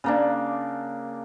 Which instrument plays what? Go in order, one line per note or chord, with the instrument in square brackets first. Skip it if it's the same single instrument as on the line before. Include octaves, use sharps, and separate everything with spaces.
[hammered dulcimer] C#3 A#3 D4